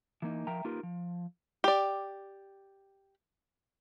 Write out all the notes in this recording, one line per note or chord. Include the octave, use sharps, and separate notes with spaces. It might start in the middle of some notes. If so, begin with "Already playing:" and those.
E3 A#3 D#4
F3 A#4 E5 G5 A#5
A#3 D#4 F4 G4 A#4 B4
F3
G4 D5